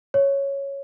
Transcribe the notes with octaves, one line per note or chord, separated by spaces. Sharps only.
C#5